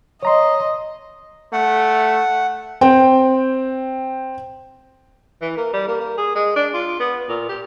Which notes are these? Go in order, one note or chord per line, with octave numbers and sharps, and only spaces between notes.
C#5 D#5 A#5 C6
A3 F#5
C4 G5
E3
A#3
G3
A#3
A#3
G#4
G#3
D4
F4
B3
A#2
G4